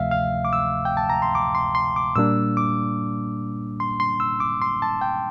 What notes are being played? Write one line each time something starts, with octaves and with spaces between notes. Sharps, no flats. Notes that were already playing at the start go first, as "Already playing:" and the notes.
Already playing: D2 C3 F3 A3 E5 F5
F5
D6
E6
G5
A5
A#5
C6
D6
C6
C6
D6
A#2 G3 A#3 D4 E6
D6
C6
C6
E6
D6
C6
A5
G5